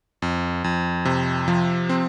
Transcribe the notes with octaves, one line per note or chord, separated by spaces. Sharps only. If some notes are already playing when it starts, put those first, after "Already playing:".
F2
F2
C3
F3
C4